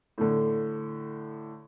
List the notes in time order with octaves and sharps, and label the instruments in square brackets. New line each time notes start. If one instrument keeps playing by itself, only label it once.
[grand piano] A2 D3